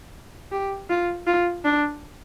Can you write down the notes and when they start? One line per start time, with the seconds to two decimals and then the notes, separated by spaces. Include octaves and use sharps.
0.52 G4
0.89 F4
1.27 F4
1.65 D4